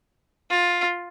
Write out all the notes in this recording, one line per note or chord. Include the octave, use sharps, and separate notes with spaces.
F4